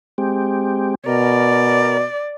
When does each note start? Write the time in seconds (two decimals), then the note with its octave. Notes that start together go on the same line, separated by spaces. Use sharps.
0.18 G#3 C4 G4
1.06 B2 A#4 D5